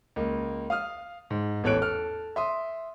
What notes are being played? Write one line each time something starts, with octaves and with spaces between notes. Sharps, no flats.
C#2 A#3
F5 D#6 F6
G#2
A1 E2 A4 C#5 F#6 D7
A4 F6
E5 C6 D#6